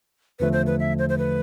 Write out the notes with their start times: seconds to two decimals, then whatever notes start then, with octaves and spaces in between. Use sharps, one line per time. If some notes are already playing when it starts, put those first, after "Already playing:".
0.39 E2 D3 F3 A3 B4
0.53 C5
0.67 B4
0.79 E5
0.98 C5
1.09 C5
1.18 B4